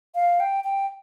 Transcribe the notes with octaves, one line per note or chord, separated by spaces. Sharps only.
F5
G5
G5